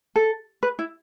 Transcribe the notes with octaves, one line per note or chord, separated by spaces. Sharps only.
A4
B4
E4